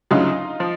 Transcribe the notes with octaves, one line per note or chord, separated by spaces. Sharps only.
D2 C#3 F#3 D#4 F4
F3